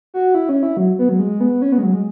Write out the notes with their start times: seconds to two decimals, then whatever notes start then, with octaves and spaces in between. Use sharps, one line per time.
0.14 F#4
0.35 E4
0.49 C#4
0.63 E4
0.77 F#3
0.99 B3
1.09 F#3
1.19 G#3
1.40 B3
1.62 C#4
1.72 B3
1.78 G#3
1.83 F#3
1.93 G#3